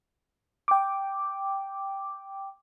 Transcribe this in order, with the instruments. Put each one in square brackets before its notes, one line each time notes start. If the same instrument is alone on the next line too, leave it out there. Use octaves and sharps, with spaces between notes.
[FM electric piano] G5 D6